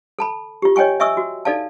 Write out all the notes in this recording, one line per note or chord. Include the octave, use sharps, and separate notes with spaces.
A4 A5 B5
F4 G4
C#5 D#5 G5 G#5 C#6
D#5 E5 G#5 C#6 D#6 E6
F#4
D#4 A4 D5 F5 A5